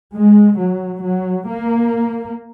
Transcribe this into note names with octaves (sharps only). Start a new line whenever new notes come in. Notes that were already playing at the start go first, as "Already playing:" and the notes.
G#3
F#3
F#3
A#3